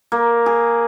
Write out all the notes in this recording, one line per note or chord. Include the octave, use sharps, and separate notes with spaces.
A#3
G#4